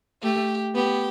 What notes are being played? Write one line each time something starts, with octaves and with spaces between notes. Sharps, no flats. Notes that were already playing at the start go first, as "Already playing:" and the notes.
A3 G4
B3 G4